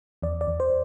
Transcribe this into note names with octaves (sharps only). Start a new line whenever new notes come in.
E2 D5
D5
E2
C5